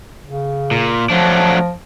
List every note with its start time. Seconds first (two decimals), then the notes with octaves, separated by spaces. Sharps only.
0.27 C#3
0.71 A#2
1.10 F3 F#3 A3 D4